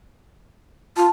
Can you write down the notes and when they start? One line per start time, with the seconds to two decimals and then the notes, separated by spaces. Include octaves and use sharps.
0.97 F4 A5